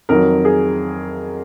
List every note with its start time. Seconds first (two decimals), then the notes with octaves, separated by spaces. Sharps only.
0.09 F2 D#3 F#3 A#4
0.45 G#4